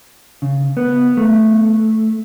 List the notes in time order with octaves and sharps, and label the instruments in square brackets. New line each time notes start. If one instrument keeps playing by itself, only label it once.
[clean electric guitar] C#3
B3
A3